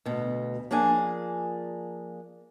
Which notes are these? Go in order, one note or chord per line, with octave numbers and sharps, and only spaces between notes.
D2 B2
F3 A#3 D4 G#4 G#5